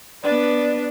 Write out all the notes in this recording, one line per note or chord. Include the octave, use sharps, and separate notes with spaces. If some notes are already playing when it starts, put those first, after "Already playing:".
B3 D4 B4 D5